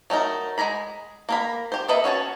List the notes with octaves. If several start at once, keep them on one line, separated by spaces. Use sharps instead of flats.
F#3 A3 D#4 A#4
G#3 G#5 A#5 B5
A#3 A#4 B5
G4 C5
A#3 A4 B4 D#5 E5
C#4 F#4 C#5 A5